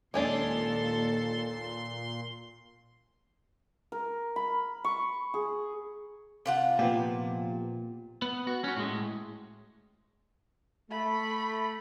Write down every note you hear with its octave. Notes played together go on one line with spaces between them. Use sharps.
D#2 A#2 G#3 C#4 D4 A4 C6
A#4
B5
C#6
G#4
C3 F4 F#5
A#2 F3 B3 G4
B3
F#4
C#4 F#4
A2 G#3
A3 B5